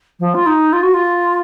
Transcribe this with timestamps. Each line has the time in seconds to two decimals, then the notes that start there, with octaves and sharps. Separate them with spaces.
0.20 F3
0.34 F4
0.46 D#4
0.73 F4
0.83 F#4
0.94 F4